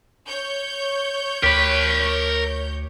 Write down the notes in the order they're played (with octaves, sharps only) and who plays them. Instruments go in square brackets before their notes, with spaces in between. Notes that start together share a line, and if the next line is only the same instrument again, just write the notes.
[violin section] C#5 G6
[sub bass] D2 [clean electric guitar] G4 [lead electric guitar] A#4 B5